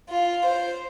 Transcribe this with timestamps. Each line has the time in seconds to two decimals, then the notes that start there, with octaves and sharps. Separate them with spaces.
0.10 F4
0.45 C5